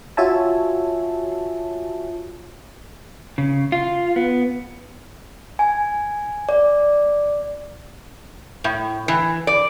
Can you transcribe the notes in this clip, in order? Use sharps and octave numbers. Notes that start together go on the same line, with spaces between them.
F4 F#4 C#5 E5 G#5 A5
C#3
F4
B3
G#5
D5
A2
E3
D5